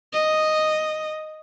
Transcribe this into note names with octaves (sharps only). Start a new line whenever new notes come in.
D#5